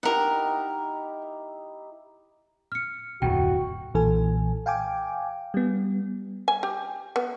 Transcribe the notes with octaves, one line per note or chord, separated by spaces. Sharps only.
D#4 E4 G4 A#4 F#5
F6 C#7
D1 F2 B2 F#4 G5
B1 A#2 E3 A4 G#5
F5 G5 G#5 D6
G3 B3
G#5
G4
B3